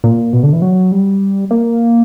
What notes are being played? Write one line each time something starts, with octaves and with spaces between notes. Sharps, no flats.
A#2
B2
D3
E3
F#3
G3
A#3